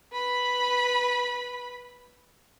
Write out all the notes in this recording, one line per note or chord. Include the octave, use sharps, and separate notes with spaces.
B4 B5